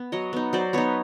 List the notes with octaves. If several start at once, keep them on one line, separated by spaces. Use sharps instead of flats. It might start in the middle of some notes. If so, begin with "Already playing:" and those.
Already playing: B3
F#3 C#5 D#5
B3 D#4
F#3 C5 D5
B3 D#4 B4 C#5